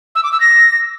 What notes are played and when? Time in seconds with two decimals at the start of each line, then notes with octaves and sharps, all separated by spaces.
0.15 E6
0.24 D6
0.32 E6
0.40 A#6